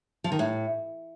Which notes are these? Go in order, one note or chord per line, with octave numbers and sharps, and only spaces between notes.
F3
D#3
A2